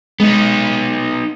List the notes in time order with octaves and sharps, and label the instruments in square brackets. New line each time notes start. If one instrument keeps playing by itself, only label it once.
[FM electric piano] G#3 [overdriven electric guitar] B3 D#4